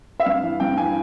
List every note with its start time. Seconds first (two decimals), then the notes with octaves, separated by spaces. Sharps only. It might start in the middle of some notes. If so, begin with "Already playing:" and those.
0.20 E5
0.25 G2 F5
0.43 E3
0.60 G2 G5
0.77 E3 G#5